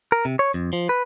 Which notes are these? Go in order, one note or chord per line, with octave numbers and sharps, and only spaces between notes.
A#4
C3
C#5
F2
F3
B4